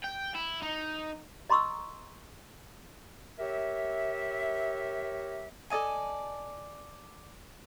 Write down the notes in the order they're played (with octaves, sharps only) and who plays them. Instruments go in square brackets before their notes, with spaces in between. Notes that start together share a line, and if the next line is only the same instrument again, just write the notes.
[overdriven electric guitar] G5
E4
D#4
[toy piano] D#5 A#5 C6 C#6 D#6 E6
[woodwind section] G4 A#4 C#5 E5
[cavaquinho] A4 D5 D#5 G#5